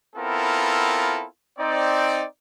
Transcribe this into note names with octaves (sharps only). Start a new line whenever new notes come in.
B3 C4 E4 F4 A4 A#4
C4 D#4 D5